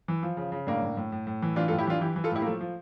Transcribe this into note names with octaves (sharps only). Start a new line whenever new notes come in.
E3
F3
C#3
C#3
A2 A#3 D4
A2
A2
A2
A2
E3
E3 D4 F4
F4 A4
A2
E4 G4
E3 D4 F4
E3 E4 G4
E3
F4 A4
A2 E4 G4
A#3
F3 A3
F3